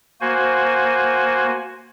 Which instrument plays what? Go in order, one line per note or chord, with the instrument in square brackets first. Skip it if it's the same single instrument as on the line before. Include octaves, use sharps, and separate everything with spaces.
[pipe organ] A#3 F#4 C5 G#5